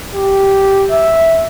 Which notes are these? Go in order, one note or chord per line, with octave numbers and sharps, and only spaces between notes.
G4
E5